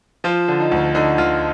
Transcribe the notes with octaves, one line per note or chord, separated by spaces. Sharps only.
F3 F4
D3
D#4
D2
D3 D#4
D2 F4